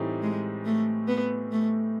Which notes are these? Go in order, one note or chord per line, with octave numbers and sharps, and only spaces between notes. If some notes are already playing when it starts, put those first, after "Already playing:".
Already playing: A2 E3 G3 C4 D#4
G#3
A3
B3
A3